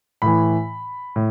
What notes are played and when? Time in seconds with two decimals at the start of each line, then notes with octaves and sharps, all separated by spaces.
0.22 A2 E3 B5
1.16 A2